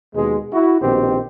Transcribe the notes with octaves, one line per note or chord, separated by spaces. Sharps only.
D#2 B2 G#3
E4 F#4
A#1 B2 D#3 C4 G4